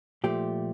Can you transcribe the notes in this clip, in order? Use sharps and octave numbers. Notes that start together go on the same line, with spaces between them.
A#2 F3 A3 G4